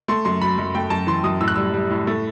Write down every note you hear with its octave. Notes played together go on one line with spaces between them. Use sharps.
A3 C6
F#2 C6
F#3 B5
F#2
A3 G5
F#2 A5
E3 C6
F#2 D#6
A2 E6
F#6
G3 E6
G3
A2
A3